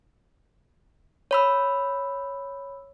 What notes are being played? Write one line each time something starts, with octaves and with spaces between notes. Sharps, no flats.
C#5 B5 E6